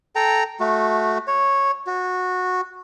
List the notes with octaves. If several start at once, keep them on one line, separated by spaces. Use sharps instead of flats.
A4 G5 A#5
A3 F#4
C#5
F#4